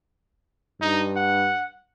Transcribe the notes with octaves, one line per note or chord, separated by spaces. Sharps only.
G2 D#4
F#5